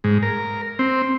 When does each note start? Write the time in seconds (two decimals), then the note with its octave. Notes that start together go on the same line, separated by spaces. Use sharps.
0.04 G#2
0.23 A#4
0.79 C4